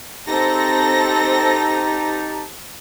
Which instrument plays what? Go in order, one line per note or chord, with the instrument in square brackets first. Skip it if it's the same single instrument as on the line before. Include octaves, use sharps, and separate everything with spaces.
[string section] C4 A4 A#6 [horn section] D#4 G4 A5